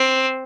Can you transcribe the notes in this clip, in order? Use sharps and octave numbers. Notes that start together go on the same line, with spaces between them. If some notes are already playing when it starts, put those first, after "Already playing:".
Already playing: C4